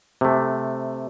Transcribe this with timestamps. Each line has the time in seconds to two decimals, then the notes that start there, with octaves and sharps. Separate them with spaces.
0.21 C3 A3